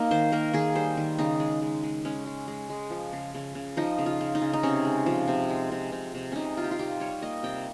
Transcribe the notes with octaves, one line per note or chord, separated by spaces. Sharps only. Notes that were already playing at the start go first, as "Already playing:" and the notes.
Already playing: A#3 D#4
D#3 C5
A#3 A#4
D#3 G#4
G3 C5
D#3
C#3 D#4
G#3
G#3
G#3
G#3 C#4
G#3
G#3
G#3
F3
C#3
C#3
C#3
F3 D#4
C#3
F4
C#3
D#4
C#3
D#4
C3 C#4
G#3
F3
C3
G#3
C3
C3
C3
C3 C#4 D#4
G3 F4
G4
F4
C3 G4
G3 C#5
A#3 D#5
C3 G5